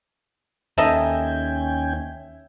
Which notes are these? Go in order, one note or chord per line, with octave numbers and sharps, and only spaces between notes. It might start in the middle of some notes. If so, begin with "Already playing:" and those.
D#2 C#4 D#4 A4 D#5 E5 G5 G#5